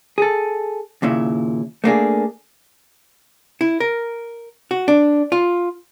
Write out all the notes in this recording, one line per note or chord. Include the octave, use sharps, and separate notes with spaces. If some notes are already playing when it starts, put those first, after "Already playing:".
G#4 A4
D#2 A#2 C#3 E4
A3 A#3 D4 G#4
E4
A#4
F#4
D4
F4